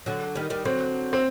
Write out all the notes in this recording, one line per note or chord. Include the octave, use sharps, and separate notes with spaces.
D3 F#3
D#3 G3
D#3 G3
D3 F#3 C4
C4